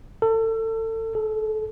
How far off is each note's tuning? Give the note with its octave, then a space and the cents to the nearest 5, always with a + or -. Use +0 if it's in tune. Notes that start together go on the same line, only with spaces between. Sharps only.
A4 +30
A4 -30